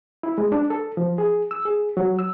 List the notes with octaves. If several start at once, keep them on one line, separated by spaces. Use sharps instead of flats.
E4
G#3
D4
A4
F3
G#4
E6
G#4
F#3
E6